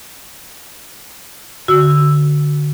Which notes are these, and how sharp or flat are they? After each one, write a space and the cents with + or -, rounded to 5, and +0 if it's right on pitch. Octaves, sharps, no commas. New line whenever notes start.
D3 +0 F#4 +0 E6 +0